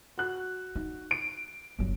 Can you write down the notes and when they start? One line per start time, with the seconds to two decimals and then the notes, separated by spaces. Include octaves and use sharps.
0.18 F#4 F#6
0.76 D#4
1.11 D7
1.79 G1 F#3